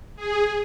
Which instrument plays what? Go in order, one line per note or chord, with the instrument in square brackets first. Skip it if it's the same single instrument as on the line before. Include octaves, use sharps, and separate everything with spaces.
[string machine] G#4